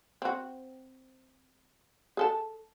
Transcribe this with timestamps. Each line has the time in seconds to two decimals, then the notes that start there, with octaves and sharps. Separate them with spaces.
0.22 C4 F#4
2.17 G#4 A4 A5